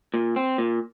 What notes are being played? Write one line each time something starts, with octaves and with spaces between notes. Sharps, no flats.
A#2
C4
A#2